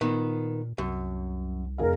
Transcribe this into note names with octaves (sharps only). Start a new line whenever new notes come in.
A#2 D#3 B3
C2 F#2
F1 G#4 A#4 F5